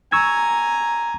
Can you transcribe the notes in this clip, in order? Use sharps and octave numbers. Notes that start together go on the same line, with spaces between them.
G#5 A#5 C#6 E6 G#6